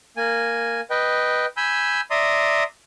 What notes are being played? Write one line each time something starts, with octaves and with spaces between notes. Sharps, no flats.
A#3 G#5
B4 D#5 G5
G#5 B5 E6 G6
D5 E5 A#5 C6 D#6